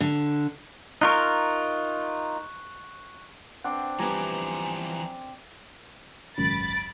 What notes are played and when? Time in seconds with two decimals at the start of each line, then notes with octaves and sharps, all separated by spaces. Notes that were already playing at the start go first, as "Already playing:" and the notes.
0.01 D3
1.01 D#4 F4 A#4 C#6 F#6
3.64 C4 D4 D5 F#5
3.99 E3 F3 G3 B3 G#5 A#5
6.38 G#1 C#2 F#2 B5 A6 D7